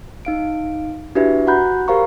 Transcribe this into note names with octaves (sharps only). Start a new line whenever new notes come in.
D#4 F5 D7
D4 E4 F#4 G4 B4 E5
F#4 F#5 A#5 B5 F#6 G6
G4 A#4 C5 F5 A#5 C#6